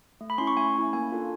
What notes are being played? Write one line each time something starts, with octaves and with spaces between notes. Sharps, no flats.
A3
B5
C#4 E4 C6
C#6
A3 G#5
C#4 E4
A#3 G#5
D4 F4 A4